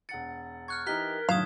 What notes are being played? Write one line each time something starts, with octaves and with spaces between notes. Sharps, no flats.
E1 F#5 A6 C#7
C#6 F6 F#6 G#6
E3 D#4 G4 A#4 F#6 B6 G7
A2 D3 D#3 F#3 F5 D#6 G#6 E7